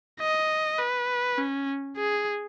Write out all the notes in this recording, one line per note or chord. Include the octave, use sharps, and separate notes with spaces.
D#5
B4
C#4
G#4